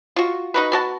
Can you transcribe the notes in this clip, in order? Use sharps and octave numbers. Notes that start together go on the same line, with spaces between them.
F4 F#4
D#4 F#4 B4
B3 F#4 A5